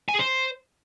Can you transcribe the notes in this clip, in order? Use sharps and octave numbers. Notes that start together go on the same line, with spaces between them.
G#5
G#4
C5